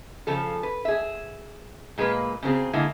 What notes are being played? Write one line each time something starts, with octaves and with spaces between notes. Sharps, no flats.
C#3 F3 A4
B4
G#4 E5
A#2 G#3 A#3 B4
C#3 F#3 C4 G#4
D3 G#3 A#3 E4